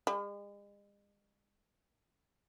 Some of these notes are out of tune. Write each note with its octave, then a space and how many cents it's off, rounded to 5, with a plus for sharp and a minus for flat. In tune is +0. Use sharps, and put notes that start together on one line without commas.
G#3 -40